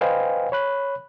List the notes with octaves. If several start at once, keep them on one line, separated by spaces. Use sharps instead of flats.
B4 C5 D#5 F5 G5 G#5
C#5 B5 F#6